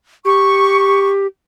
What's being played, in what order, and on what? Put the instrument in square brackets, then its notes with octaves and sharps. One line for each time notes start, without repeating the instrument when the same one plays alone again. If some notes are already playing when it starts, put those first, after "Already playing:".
[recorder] G4 [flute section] C#6